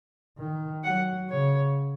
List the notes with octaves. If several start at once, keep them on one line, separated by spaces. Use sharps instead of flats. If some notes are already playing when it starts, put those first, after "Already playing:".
D#3
F#3 F#5
C#3 C#5